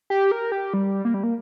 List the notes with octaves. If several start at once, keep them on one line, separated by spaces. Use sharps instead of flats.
G4
A#4
G4
G3
A#3
G3
A#3